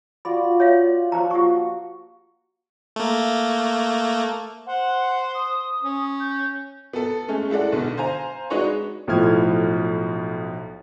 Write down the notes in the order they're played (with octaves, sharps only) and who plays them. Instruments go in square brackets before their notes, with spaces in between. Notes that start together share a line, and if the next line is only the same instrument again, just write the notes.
[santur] F4 F#4 D5 [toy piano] B5
[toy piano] C#5 E5 F5
[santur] F3 C#6 [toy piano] C5 A#5
[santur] A#3 F#4 [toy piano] G4 C#6
[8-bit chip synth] A3 A#3
[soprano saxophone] C5 [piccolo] F#5
[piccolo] D#6
[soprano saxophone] C#4
[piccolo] G6
[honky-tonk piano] B3 A4
G#3 A3 C#4
G#3 E4 A4 D5 F#5
B1 D3 B3
C5 F5 G#5 A#5
G#3 D4 D#4 F#4 B4 C#5
[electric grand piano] B1 A2 F3 F6 G#6